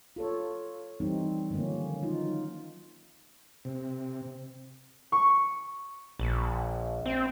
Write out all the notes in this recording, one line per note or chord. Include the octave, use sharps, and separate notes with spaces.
F4 A4 C#5
E3 G3 C4 D#4
D3 D#3 F3 A#3 C#4
F#3 D#4 F4
C3
C#6
A#1
C4